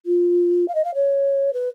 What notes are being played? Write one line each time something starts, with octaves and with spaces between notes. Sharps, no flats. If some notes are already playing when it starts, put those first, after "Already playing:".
F4
F5
D#5
F5
C#5
B4